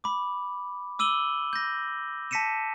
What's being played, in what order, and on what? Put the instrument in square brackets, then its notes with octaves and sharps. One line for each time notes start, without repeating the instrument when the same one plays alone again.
[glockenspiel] B5 D6
D6 E6 D#7 F#7 G7
G6 A#6
A5 A#6 B6 C#7 D#7 E7